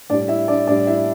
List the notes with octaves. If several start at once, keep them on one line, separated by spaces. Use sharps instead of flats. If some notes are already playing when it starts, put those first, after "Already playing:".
A2 G3 D4 D5
E4 E5
D4 D5
A2 G3 D4 D5
E4 E5